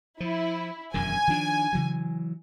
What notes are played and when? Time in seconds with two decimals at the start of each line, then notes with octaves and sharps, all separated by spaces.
0.20 F3 E4
0.94 E1 F#2 D#3 G#5
1.27 D#3 F3 D4
1.73 C#3 E3 F#3